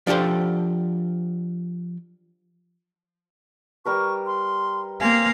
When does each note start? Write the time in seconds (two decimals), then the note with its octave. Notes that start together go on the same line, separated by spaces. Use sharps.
0.07 F3 D4 G4 A4 C5
3.86 G3 A#4 B4 C#6
4.26 C6
5.01 A#3 C4 F5 G#5